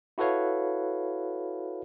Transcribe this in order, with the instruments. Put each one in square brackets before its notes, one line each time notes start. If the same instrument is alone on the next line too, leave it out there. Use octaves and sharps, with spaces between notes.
[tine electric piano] E4 F#4 A4 B4 C#5 F5